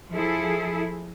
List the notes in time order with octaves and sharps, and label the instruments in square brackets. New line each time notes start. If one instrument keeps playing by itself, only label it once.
[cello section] F3 E4 G#4 A4